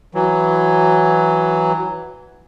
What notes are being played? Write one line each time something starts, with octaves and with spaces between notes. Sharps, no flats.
E3 F#3